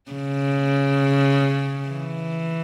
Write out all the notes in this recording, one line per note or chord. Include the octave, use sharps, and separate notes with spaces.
C#3
E3